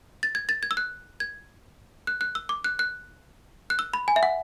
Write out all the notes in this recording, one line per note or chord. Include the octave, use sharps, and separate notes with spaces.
A6
G#6
A6
G#6
E6
F#6
G#6
F#6
F#6
E6
D6
F#6
F#6
F#6
E6
B5
G#5
E5
F#5